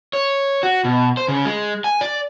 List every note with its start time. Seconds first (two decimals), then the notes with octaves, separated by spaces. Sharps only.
0.13 C#5
0.63 F#4
0.85 B2
1.17 C5
1.28 C#3
1.45 G#3
1.84 G#5
2.01 D5